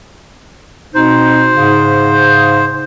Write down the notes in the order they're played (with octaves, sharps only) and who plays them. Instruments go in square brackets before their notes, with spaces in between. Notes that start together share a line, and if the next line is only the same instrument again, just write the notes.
[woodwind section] B2 C4 D#4 [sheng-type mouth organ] C5
[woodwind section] G#2 C#3